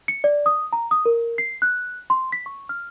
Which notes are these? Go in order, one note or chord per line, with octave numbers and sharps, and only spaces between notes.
C#7
D5
D#6
A#5
D#6
A#4
C7
F#6
C6
B6
C#6
F6